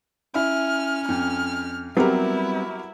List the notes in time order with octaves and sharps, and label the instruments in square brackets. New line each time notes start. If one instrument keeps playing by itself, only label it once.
[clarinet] C#4 [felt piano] E4 [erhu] F6
[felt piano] F2 [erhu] F6
[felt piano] F#3 G4 A#4 [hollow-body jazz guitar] G3 B3 C4 [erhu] E4